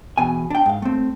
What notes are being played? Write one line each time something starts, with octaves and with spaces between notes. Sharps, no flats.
E2 B2 G#5
D4 G5
G#2 F5
A3 C4